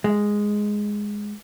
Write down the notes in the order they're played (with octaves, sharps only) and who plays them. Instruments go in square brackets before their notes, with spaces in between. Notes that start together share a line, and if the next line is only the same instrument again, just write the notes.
[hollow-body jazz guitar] G#3